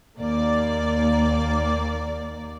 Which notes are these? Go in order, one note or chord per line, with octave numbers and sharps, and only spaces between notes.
D#2 A#3 D5